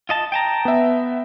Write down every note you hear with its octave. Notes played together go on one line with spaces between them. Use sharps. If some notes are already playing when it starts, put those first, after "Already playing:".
F4 D#5 A5
G5 A5 A#5
B3 E5